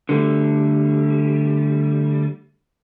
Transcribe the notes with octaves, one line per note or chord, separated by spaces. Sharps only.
D3 G3 A3